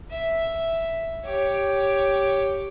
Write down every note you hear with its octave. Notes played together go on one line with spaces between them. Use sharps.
E5
G4 C#5